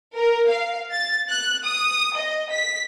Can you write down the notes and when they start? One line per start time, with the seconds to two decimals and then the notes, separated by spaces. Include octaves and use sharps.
0.15 A#4
0.49 F5
0.91 A6
1.29 F#6
1.65 D#6
2.16 D#5
2.52 B6